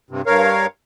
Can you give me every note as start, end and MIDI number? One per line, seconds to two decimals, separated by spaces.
0.10 0.22 43
0.10 0.22 48
0.26 0.66 43
0.26 0.66 70
0.26 0.66 73
0.26 0.66 77